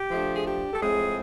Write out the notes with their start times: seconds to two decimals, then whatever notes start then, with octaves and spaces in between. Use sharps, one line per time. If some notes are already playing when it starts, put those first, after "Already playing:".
Already playing: G4
0.10 F3 A3 D4
0.35 G#4
0.46 G4
0.73 A4
0.81 A2 F3 G#3 C4 G#4